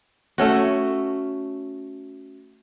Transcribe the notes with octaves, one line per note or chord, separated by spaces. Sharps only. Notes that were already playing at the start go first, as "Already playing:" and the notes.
A3 C#4 F#4